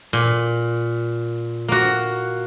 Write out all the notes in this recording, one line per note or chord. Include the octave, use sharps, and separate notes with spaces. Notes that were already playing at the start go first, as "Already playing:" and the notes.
A#2
A#3 F#4